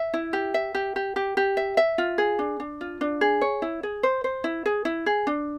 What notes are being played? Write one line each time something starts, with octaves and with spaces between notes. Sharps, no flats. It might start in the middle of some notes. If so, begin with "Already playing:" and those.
Already playing: E5
E4
G4
E5
G4
G4
G4
G4
E5
E5
F4
G#4
D4
D4
F4
D4
G#4
C#5
E4
G#4
C5
C5
E4
G#4
E4
G#4
D4